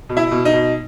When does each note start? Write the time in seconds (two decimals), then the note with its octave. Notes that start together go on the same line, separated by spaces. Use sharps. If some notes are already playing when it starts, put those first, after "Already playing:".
0.09 B2
0.17 E4
0.31 B2
0.45 D#4
0.53 B2